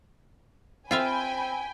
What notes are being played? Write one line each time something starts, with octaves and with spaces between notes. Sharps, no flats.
C4 F4 E5 F5 G5 G#5 B5